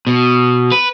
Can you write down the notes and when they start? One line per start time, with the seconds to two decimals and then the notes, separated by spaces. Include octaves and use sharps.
0.07 B2
0.72 B4